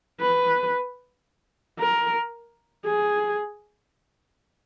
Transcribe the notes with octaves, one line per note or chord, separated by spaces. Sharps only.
B4
A#4
G#4